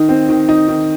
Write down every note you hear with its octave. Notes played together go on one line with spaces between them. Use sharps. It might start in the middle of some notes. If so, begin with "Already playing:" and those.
Already playing: D#3 D#4
C4
D#3
D#4
D#3